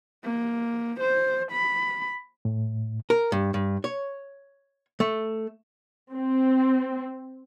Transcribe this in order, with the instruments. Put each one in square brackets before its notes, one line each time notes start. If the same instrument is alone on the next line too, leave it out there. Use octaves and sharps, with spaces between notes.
[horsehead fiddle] A#3
C5
B5
[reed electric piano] A2
[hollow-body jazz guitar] A#4
G2
G2
C#5
A3
[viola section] C4